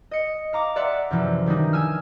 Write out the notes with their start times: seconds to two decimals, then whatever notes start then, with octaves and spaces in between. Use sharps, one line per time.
0.11 D#5 C#7
0.53 F5 A#5 D6
0.76 D5 E5 F#5 C6
1.11 F#2 C3 E3 F3
1.46 D#3 G3 D4 D#4
1.73 G#5 E6 F6